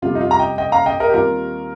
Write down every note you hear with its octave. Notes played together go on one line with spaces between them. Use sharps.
F2 C3 G3 F4
D#4
F4
A#5
D#5 G5
D#5 G5
F5 A#5
D#5 G5
A#4 D#5
G4
D#2 D#3 G3 C4 F4 A#4